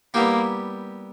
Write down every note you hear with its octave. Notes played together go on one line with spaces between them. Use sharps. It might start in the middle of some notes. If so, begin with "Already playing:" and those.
G3 A#3 B3 E4 G4